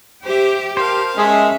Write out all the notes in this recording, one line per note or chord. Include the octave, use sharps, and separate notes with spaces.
G4 C5 E5
A#4 C5 F5 A5
G#3 C#4 E5